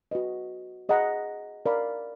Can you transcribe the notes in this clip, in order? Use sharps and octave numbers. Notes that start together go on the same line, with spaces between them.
F#4 B4 D#5
G#4 D#5 F#5 A#5
A#4 D5 F5 B5